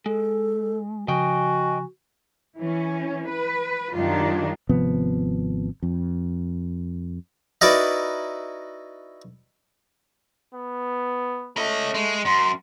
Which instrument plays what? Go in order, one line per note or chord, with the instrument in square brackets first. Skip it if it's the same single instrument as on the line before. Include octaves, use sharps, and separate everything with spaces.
[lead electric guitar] G#3 [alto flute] A4
[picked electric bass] C#3 F3 [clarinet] F#4 [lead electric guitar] D#5 G5 [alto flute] G#5
[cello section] E3 C#4
B4
F#2 D#3 G3 D4 F4
[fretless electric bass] G#1 C3 F3 B3
F2
[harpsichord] D#4 E4 F#4 A#4 B4 D5
[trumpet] B3
[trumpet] A3 [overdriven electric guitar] C#4 D#5
[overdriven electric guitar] G#3
[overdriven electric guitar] F#2 [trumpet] C6